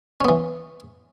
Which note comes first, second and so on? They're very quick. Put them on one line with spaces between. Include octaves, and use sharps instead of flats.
C#4 B3 E3